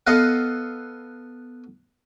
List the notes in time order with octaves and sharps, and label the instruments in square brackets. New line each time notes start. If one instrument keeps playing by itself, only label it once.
[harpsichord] B3 A4 D#5 F5 F#5